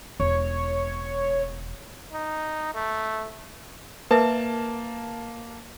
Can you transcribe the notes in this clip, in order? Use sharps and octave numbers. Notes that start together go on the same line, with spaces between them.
E1 C#5
D#4
A3
A#3 A#4 B4 E5 A5